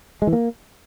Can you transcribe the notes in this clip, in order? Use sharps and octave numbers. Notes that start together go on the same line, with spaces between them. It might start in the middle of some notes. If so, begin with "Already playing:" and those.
G#3
E3
A#3